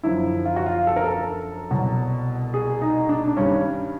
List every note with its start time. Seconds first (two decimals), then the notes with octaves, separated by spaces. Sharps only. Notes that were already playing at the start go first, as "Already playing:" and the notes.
0.03 F#2 D3 F3 E4
0.45 F4
0.56 F#4
0.66 F4
0.87 A4
0.96 A#4
1.04 A4
1.71 C2 B2 F#3
2.54 G#4
2.82 D#4
3.09 D4
3.28 D4
3.37 G2 D#3 G3 C#4